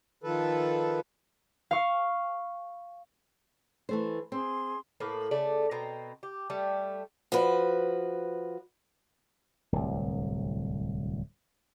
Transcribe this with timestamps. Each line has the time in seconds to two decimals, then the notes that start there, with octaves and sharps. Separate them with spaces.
0.23 D#3 F3 A4 B4
1.71 F5 C#6
3.89 E3 A3 C5
4.32 C4 G#4 C6
5.00 A2 A#3 B4
5.31 C#3 A3 D5
5.71 B2 C4 A#5
6.23 G4
6.50 G3 A3
7.32 F3 F#4 B4
9.72 D1 C2